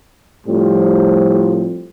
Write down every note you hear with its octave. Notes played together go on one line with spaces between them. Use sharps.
A2 F3 G3 C4